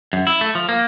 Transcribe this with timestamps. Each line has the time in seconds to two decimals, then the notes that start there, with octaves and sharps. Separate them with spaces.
0.13 F#2
0.27 E4
0.41 A3
0.55 F3
0.69 A#3